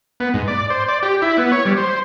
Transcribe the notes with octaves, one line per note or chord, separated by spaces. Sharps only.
B3
G#2
D5
C5
D5
G4
E4
B3
C#5
G3
C5